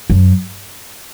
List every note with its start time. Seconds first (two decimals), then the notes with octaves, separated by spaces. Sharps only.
0.10 F#2